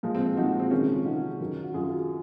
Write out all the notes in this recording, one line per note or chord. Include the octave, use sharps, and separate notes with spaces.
A#2 F3 G#3
C4
C4
A#2 F3 G#3 D#4 F#4
C4
C3 D#3 G#3 C#4
D#4
F4
C3 D#3 G#3 D#4 F#4
F#2 D#3 F#3
F#4
F#2 D#3 F#3 F4 G#4